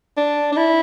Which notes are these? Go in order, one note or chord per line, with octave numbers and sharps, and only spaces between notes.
D4
D4
E4